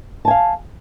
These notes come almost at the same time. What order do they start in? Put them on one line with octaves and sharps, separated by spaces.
A5 G#5 F5